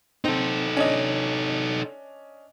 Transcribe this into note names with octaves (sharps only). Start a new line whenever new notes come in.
C4 D#4 A4
C#4 D4 D#5